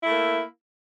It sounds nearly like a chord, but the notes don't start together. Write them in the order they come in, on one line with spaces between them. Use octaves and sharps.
E4 A3 A#3